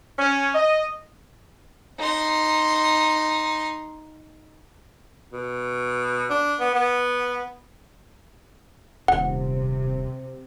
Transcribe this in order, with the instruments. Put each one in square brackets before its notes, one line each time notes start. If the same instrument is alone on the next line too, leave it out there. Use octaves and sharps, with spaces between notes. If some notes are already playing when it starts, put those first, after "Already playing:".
[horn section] C#4
D#5
[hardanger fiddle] D#4 C6
[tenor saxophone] B2
D4
B3
B3
[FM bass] D#1 [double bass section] C3 [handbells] F#5